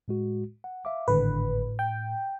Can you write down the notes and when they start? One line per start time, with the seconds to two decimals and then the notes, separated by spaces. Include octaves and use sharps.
0.08 A2 G#3 F#4
0.64 F#5
0.85 E5 F5 D6
1.08 G#1 A2 D3 B4
1.79 G5